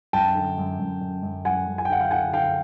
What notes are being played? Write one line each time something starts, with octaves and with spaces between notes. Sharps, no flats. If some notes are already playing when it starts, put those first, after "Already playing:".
F#2 G5 A5
D3
F#2
F#2
F#2
F#2
F#2 F#5 G#5
F#2
G#5
G5
D3 F#5
F5 G5
D3 F#5 G#5
D3 F5 G5